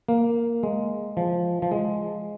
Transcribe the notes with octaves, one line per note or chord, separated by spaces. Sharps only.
A#3
G#3
F3
F3
G#3